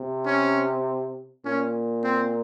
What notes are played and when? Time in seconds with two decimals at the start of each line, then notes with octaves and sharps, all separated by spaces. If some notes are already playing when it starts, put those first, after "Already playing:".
Already playing: C3
0.26 C#4
1.45 A#2 C#4
2.03 C4